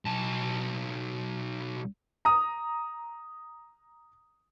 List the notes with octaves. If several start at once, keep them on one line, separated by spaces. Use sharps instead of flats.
B1 A5
A#5 D#6